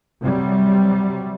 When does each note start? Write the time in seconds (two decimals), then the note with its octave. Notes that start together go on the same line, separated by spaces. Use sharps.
0.23 C3 F#3 G3